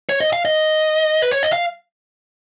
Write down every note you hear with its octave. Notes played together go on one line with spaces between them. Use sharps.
C#5
D#5
F5
D#5
B4
C#5
D#5
F5